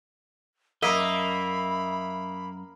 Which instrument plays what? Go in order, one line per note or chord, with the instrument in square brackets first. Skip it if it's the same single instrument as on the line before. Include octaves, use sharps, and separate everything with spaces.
[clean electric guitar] F#2 D#5 [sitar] A#3 [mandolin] E5 [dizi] B5